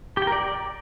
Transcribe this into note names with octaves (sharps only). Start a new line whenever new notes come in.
G4
G5
A#4
D5